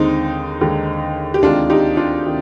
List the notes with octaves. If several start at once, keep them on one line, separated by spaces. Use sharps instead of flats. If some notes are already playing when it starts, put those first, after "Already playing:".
Already playing: D#2 D3 G#3 C4 D#4
D#2 D3 G#3
G4
D2 C3 D#3 G#3 D4 F4
D#4 G4
D4 F4
C3 D#3